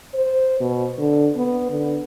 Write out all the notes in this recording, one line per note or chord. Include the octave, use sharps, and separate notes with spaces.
C5
B2
D3
B3
D3